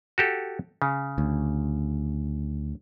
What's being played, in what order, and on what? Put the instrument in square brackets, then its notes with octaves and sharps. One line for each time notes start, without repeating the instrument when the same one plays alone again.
[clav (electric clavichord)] F#4 G4 A4
C#3
[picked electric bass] D2